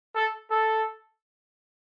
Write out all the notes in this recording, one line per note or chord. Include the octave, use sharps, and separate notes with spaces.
A4
A4